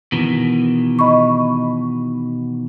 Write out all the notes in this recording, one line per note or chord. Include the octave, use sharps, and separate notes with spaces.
B2 D#3 E3
D#5 B5 C#6